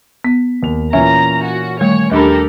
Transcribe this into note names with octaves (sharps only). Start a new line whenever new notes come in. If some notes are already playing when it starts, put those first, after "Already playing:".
B3 B6
D#2 F7
A#2 E3 C#4 E5 A#5
F#4
D#3 G3 A3 C#5
D#2 D4 G4 A4 A#4 B5